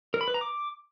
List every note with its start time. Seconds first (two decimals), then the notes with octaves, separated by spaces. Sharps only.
0.14 A#4
0.21 B5
0.28 B4
0.34 A#5
0.41 D6